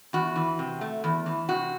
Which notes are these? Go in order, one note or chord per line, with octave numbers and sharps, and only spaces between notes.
E2 F#4
E3
C3
A3
E2
E3
C3 F#4